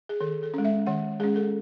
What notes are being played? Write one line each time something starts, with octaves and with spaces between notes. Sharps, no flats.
G#4
D#3 A4
A4
G#3 C#4
E5
D#3 F#5
G#3 C#4 G#4
A4